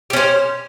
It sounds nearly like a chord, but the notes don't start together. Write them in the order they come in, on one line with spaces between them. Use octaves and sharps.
G4 C#4 C5